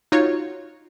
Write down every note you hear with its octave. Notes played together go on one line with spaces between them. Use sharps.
D#4 F4 F#4 C#5